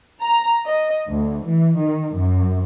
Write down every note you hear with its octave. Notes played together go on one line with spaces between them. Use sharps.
A#5
D#5
D2
E3
D#3
F#2